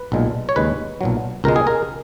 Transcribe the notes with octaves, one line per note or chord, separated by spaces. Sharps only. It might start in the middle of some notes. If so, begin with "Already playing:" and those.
Already playing: B4
B1 A#2 G#3
C#5
D#2 C#3 G#3 B4
B1 A#2 F#3
C#2 B2 G#3 A#4
G#4
A#4